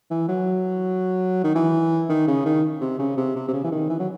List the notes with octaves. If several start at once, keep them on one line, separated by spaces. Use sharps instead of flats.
E3
F#3
D#3
E3
D#3
C#3
D#3
C3
C#3
C3
C3
C3
C#3
E3
D#3
E3
F#3